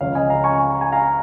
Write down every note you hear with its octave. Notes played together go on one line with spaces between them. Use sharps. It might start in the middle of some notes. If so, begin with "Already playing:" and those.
C#2 C#3 F3 C#5 F5
D#5 G#5
F5 A#5
G#5 C#6
C#6
A#5
G#5
F5 A#5